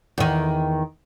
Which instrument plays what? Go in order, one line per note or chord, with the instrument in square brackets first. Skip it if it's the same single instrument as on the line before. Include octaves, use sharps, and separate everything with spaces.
[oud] E2 D#3